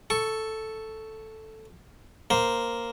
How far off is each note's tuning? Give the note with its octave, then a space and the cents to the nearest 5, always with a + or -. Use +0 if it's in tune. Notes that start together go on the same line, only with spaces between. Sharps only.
A4 +0 C#6 +0
A#3 +0 C5 +0